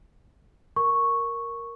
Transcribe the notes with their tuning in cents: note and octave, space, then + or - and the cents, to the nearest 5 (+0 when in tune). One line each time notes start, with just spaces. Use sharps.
A#4 +0 C#6 -5